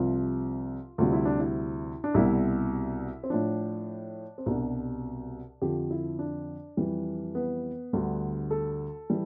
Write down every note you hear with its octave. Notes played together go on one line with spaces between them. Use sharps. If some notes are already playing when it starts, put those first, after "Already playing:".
Already playing: C2 C3 F3 F4
D2 C3 G3 F4
E4
D4
E4
D4
C2 B2 G3 E4
C4
A2 F3 D4
C4
C2 B2 G3 D4
F2 D3 F3 G4
E4
D4
F2 E3 G3
B3
D2 D3 G3
A4
E3 G3